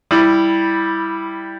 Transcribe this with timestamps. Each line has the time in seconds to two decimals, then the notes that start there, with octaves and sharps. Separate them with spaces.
0.11 G3 E4